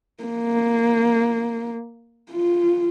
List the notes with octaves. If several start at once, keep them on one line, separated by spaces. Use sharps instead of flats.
A#3
F4